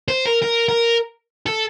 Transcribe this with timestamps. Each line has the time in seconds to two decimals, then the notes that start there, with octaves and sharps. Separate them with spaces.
0.08 C5
0.25 A#4
0.42 A#4
0.69 A#4
1.46 A4